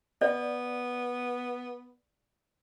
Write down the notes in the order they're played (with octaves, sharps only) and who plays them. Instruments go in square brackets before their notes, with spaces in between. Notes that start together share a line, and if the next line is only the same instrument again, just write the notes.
[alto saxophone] B3 [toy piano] D5